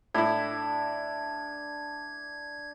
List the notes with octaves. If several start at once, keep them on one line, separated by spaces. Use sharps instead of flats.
A2 D4 E4 G#6